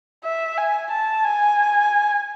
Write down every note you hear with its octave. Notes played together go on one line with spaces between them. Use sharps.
E5
G#5
A5
G#5